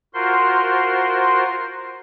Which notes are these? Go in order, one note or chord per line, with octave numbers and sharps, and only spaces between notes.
F4 F#4 A#4 C5 C6